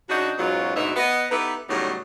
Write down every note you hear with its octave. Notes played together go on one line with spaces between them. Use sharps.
C#3 D4 D#4 F#4
E2 G#2 B2 F#3 C#4 F4
D2 G#2 B2 D#4 E5
B3 D#5
B3 D#4 E4 G4 A4 B4
A2 C#3 F#3 G3 B3 D#4